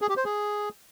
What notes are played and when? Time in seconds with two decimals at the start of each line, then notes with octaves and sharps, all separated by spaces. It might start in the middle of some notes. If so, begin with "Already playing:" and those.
0.01 G#4
0.09 G4
0.17 C5
0.25 G#4